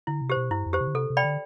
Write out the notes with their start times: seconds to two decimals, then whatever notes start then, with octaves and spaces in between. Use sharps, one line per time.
0.07 D3 E4
0.21 C3
0.30 G4 C5
0.37 B2
0.50 G2 E4
0.66 F2
0.73 G4 C5
0.81 C3
0.87 D3
0.94 C3 A4
1.10 C3
1.17 D5 G5 B5
1.24 D3